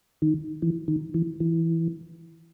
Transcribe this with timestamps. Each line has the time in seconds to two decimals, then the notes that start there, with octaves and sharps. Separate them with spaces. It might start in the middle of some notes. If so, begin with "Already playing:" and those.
0.22 D#3
0.62 E3
0.88 D#3
1.14 E3
1.40 E3